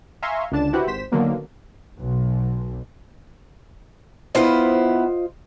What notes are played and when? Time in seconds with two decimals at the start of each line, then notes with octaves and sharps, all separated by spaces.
0.23 E5 F5 G#5 A#5 C6 C#6
0.52 C#2 D3 D4 A5 E7
0.73 E4 F#4 G4 B4 C5 F#5
0.87 G#1 C5 B6 E7
1.12 D3 D#3 F#3 A#3 B3
1.98 B1
4.35 B3 E4 F4 C5 D#5